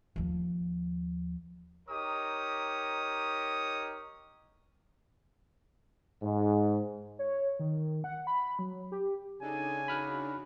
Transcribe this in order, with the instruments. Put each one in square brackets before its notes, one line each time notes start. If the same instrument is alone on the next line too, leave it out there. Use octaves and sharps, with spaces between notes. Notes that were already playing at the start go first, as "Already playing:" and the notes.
[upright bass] D#2 F3
[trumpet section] D#4 G4 A#4 C#5 D#6
[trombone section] G#2
[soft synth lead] C#5
D#3
F#5
B5
F#3
G4
[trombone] C#3 [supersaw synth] D4 D#4 A4 [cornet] G#5
[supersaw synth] D4 D#4 F#4 [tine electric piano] B5 F6 F#6